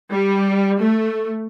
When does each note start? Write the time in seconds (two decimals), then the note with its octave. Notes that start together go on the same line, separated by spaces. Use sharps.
0.12 G3
0.81 A3